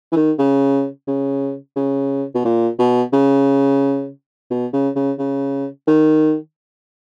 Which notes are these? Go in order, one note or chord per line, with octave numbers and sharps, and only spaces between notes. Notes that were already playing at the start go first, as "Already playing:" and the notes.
E3
D#3
C#3
C#3
C#3
B2
A#2
B2
C#3
B2
C#3
C#3
C#3
D#3